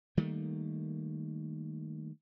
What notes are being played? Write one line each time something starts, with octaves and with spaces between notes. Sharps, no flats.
D#3 G3 A3 A#3